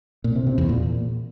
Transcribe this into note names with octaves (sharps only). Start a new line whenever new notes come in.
A#2
C3
C3
E2
A#2